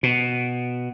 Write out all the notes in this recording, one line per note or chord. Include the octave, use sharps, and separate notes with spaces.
B2